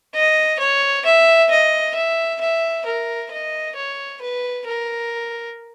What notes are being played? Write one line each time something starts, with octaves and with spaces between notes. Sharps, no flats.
D#5
C#5
E5
D#5
E5
E5
A#4
D#5
C#5
B4
A#4